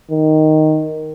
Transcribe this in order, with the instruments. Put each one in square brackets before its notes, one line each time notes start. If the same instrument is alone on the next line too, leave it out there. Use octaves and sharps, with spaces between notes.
[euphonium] D#3